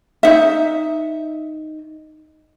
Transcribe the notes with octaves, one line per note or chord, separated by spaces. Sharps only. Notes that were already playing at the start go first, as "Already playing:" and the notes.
D#4 E5